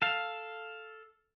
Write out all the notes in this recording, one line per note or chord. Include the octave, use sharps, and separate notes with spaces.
A4 F5